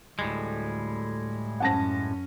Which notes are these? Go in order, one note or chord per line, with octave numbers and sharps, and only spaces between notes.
D2 A2 G3 G#3
F#2 C#4 F#5 A5 A#6